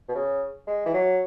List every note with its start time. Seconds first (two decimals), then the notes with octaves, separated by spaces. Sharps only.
0.09 B2
0.15 C#3
0.67 G#3
0.86 E3
0.94 F#3